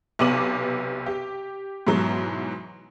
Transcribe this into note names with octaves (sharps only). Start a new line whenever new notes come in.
B1 C3 B3 D6 D#7 F#7
G4
G#2 B2 E3 F#3